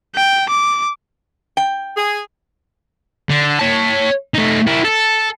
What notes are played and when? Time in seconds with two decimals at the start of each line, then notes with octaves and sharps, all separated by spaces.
0.15 G5
0.49 D6
1.57 G5
1.96 G#4
3.30 D3
3.59 C#5 A5
4.34 A3 D#4
4.67 E4 A#4
4.84 A4